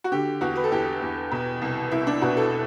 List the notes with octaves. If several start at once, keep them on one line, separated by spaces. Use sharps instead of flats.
F#4
D3 G4
E2 F#4
B4
A4
E2 G4
E2
B2
C2
C2 E4
D4
B2 F#4
A4